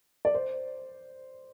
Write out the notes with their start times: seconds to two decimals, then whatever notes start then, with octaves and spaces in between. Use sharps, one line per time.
0.25 D5
0.34 C5